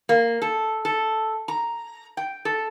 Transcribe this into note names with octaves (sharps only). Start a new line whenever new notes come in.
A#3
A4
A4
A#5
G5
A4